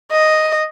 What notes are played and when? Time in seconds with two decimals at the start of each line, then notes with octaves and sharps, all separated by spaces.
0.11 D#5